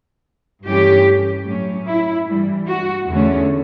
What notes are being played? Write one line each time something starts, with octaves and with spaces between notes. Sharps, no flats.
G2 E3 A3 C#4 G4
A2 F#3 A3 C#4
E4
G2 E3 G3
F#4
E2 D3 A3 C#4